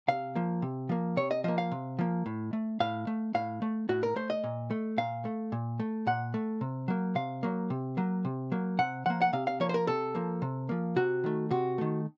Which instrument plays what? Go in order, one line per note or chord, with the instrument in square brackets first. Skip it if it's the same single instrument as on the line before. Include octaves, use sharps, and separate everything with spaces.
[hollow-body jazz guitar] C3 F5
F3 A#3
C3
F3 A#3
C3 C#5
D#5
F3 A#3 D#5
F5
C3
F3 A#3
A2
A3
A2 F5
A3
A2 F5
A3
A2 F#4
A#4
A3 C5
D#5
A#2
A3
A#2 F5
A3
A#2
A3
A#2 F#5
A3
C3
F#3 A#3
C3 F5
F#3 A#3
C3
F#3 A#3
C3
F#3 A#3
C3 F#5
F3 A#3 F#5
F#5
C3 F5
F5
F3 A#3 C#5
C5
A#4
C3 A4
F3 A#3
C3
F3 A#3
C3 F#4
D#3 A3
C3 F#4
D#3 A3